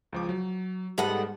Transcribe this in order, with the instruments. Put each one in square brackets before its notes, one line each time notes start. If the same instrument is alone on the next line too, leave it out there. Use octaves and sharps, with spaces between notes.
[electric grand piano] C#2 F3 D6
F#3
[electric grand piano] G#2 G3 G#3 [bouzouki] B3 A4 F#5